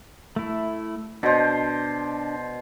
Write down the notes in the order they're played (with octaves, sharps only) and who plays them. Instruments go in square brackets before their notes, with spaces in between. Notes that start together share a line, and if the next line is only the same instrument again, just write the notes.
[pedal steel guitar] A3 E4
[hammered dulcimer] B2 C5 [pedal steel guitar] D4